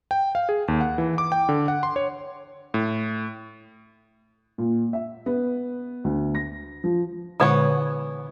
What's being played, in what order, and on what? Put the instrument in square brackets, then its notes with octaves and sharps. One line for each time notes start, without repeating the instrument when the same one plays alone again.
[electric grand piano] G5
F5
G#4
D#2
F#5
E3
D6
G5
D3
F#5
C6
C#5
A2
[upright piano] A#2
E5
B3
D2
A#6
F3
[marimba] A#2 D3 G#3 [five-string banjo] E3 B3 C#5